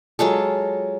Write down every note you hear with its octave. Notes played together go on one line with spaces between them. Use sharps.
F#3 G#3 F4 A4